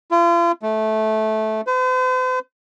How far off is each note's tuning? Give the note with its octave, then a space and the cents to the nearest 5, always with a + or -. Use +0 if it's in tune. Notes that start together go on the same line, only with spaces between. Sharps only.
F4 -40
A3 -15
C5 -45